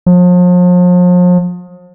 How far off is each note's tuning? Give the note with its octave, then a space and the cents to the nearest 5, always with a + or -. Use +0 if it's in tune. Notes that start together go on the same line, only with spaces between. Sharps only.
F3 +40